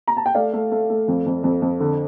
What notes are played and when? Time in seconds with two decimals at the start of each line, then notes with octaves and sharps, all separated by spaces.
0.07 A#5
0.17 A5
0.26 G5
0.35 A3 D5 F5
0.53 A3
0.72 A3
0.90 A3
1.08 F2
1.26 F2
1.44 F2
1.62 F2
1.80 D3